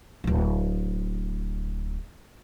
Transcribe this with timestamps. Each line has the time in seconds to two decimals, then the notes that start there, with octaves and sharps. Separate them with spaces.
0.24 D1 G1